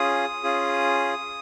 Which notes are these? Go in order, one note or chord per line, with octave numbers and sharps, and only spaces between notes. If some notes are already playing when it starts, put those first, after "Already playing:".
Already playing: C#4 F4 G#4 D#6
C#4 F4 G#4